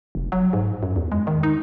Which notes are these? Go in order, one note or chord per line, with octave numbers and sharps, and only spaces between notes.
F1
F#3
G#2
F#2
E2
G#3
D#3
D#4